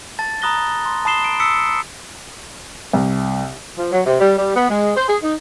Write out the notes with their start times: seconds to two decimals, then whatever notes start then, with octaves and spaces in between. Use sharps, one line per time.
0.19 A5 A6
0.42 A#5 B5 D#6 F#6 A#6 G7
0.86 C6
1.05 A5 B5 D#6 C7 E7 G7
1.24 D7
1.40 D#6 E6 B6 C#7
2.93 C2
3.78 F3
3.92 F#3
4.06 C3
4.21 G3
4.38 G3
4.56 B3
4.69 G#3
4.95 C5
5.07 G#4
5.22 D#4